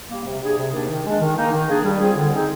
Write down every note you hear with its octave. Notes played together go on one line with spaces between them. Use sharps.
G3 A#3
C3
G3 D4 G#4
C3
D#3 A#3 D4 G4
D#3
G#3 D4
D#3
A#3 D#4
D#3
A#3 D4 G#4
G3
C4 F4 G#4
D3
G#3 C4 D#4 G#4